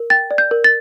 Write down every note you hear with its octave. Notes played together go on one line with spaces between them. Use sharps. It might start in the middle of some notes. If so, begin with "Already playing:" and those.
Already playing: A#4
G5 A6
D5
G6
A#4
A6